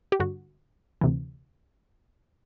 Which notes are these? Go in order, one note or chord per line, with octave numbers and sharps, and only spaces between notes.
G4
G2 D3 F#4
D2 C3 E3